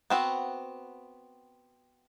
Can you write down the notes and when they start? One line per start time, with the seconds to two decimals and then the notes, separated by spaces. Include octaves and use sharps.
0.10 B3 C4 F#4